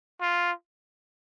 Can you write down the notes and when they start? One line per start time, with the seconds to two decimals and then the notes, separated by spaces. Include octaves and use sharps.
0.21 F4